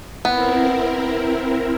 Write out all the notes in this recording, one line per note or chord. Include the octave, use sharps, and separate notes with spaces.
B3 C4 E4 A#4